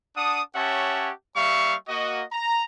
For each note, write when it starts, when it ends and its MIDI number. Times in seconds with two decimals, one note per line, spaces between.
0.16 0.41 62
0.16 0.41 78
0.16 0.41 81
0.16 0.41 87
0.55 1.11 61
0.55 1.11 67
0.55 1.11 73
0.55 1.11 76
0.55 1.11 78
0.55 1.11 81
1.36 1.75 55
1.36 1.75 58
1.36 1.75 76
1.36 1.75 77
1.36 1.75 85
1.88 2.23 58
1.88 2.23 66
1.88 2.23 75
2.32 2.64 82